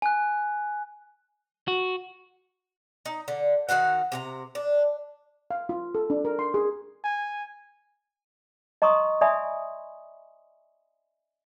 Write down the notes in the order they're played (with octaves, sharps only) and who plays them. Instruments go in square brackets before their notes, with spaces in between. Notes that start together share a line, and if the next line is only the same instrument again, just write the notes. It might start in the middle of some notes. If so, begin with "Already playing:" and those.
[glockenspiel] G#5 F#6
[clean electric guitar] F#4
[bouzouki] D#4
D3
D#3 F#4 F5 F#5
C3 G4 A#5
D4
[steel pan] F5
F4
A4
D4
A#4
C6
G#4
[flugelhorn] G#5
[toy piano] D#5 A#5 C6 C#6 D#6
D5 E5 G#5 B5 C6 D#6